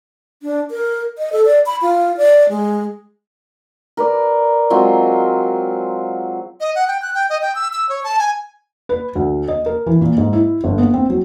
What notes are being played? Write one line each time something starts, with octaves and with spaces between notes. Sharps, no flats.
D4
A#4
D#5
A4
D5
B5
F4
D5
G#3
A#4 B4 D5
F#3 G#3 C4 F4
D#5
F#5
G5
F#6
G5
D#5
G5
E6
E6
C#5
A5
G#5
B4
D2
D#5
A#4
E3
A#2
G#2
E4
G1
B3
C4
F#3